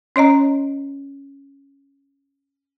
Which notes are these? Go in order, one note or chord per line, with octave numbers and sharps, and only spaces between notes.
C#4 C#5 D#5 A#5